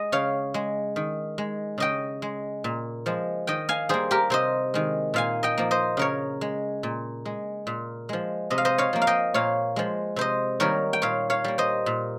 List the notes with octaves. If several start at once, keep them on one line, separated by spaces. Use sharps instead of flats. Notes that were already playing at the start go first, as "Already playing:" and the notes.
Already playing: G#3 D#5
C#3 C#5 F5
G#3
D#3
G#3
C#3 D#5 G5
G#3
A#2
F3 G#3
D#3 D#5 G5
F5 G#5
G3 A#3 G#4 C5
G4 A#4
C3 C5 D#5
D#3 G#3
A#2 F5 G#5
D#5 G5
F3 A#3
C5 D#5
C#3 A#4 C#5
G#3
A#2
G#3
A#2
F3 G#3
C3 D#5
F5
C5 D#5
C#5 F5
F3 A#3
F5
D#5 G5
A#2 C#5 F5
F3 G#3
C3 C5 D#5
D#3 G3 A#3 A#4 C#5
G5
A#2 C#5 F5
C#5 F5
G3 A#3
C5 D#5
A#2